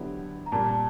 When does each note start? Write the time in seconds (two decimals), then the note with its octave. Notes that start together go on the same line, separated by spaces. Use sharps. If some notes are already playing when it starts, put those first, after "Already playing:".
Already playing: D3 F#3 B3 E4 G4
0.46 A#5
0.52 A#2 G3 A#3 A5